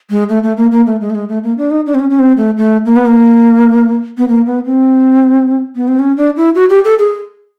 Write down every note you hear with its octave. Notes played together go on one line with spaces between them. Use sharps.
G#3
A3
A3
A#3
A#3
A3
G#3
A3
G#3
A3
A#3
D4
D#4
D4
C4
C#4
C#4
C4
A3
A3
A#3
B3
A#3
B3
A#3
B3
C4
B3
C4
C#4
D4
E4
F#4
G4
A4
G#4